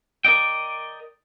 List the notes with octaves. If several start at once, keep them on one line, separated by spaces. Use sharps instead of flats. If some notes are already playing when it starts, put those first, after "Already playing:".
A#4 D5 D#5 G5